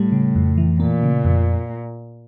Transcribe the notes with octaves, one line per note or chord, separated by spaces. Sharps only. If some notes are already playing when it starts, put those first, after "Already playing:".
Already playing: A2 G3
C#3
F2
E3
A#2 A#3
C#3
F2